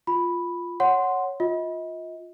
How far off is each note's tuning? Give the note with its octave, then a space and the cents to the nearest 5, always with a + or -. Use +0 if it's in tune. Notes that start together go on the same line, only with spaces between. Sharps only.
F4 +0 B5 +0
C#5 +0 F#5 +0 C6 +0
F4 +15 D#5 +35